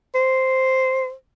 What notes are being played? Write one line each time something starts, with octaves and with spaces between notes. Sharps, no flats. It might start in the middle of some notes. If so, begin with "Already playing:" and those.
C5